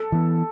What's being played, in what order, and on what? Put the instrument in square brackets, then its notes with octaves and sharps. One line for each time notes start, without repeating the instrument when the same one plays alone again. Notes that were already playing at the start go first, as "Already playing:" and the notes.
Already playing: [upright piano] A4
[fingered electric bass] E3 B3